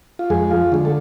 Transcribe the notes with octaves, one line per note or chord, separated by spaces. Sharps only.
F4
F2 G#3 G#4
F3 F4
D3 G#3
A4